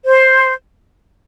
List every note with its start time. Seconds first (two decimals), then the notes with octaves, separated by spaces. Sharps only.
0.06 C5